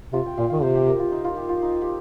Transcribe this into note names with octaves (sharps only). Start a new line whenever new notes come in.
C3 F4
G5
A#2 F5
D#3 F5
C3 C5
G4
A#4
F4
D#4
F4
G4
F4
D#4
G4